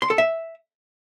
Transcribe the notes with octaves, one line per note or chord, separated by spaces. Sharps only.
C6
A4
E5